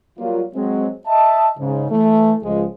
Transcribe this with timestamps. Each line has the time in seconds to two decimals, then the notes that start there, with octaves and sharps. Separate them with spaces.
0.19 F#3 G3 A#3 F4
0.55 F#3 G#3 C4
1.07 D#5 E5 A5
1.58 G#2 C#3
1.90 E3 A3
2.43 C#2 F3 G#3